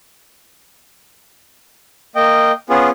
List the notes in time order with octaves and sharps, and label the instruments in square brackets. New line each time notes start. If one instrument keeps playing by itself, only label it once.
[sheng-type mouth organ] A#3 D#5 G5
B3 C#4 F4 G#4